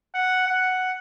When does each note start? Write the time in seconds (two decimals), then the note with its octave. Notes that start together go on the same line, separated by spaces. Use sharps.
0.15 F#5
0.47 F#5